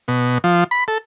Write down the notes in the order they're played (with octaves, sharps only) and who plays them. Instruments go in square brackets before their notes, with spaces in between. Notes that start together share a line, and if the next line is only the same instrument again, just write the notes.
[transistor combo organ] B2
F3
B5
A4